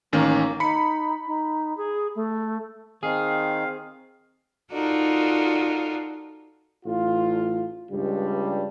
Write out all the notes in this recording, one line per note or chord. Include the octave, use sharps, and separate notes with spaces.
A1 D#3 A#3 C#4
D#4 B5 C#7
D#4
G#4
A3
D#3 C4 G#4 F5
D#4 F4 F#4 A4 A#4 D5
A1 A2 F4
C#2 G2 G3